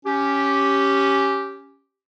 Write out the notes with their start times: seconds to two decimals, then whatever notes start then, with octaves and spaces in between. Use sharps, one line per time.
0.06 C#4 G4